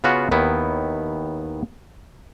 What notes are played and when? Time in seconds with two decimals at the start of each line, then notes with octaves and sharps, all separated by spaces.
0.04 C#3 B3 C#4 F4 F#4
0.31 D#2 D#3 B3 E4